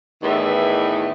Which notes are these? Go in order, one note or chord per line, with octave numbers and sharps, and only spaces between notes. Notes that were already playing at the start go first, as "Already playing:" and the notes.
E2 A2 D#3 E3 D#4 E5